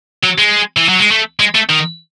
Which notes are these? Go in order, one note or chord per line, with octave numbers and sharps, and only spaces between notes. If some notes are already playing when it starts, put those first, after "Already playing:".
F#3
G#3
E3
F#3
G#3
A3
G#3
A3
D#3